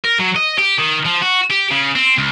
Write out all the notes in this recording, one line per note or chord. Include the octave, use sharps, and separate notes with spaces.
A#4
F#3
D#5
G4
D#3
F3
F#4
G4
C#3
C4
C#2